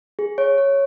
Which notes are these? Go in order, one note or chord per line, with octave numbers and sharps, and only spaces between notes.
G#4
C#5
C#5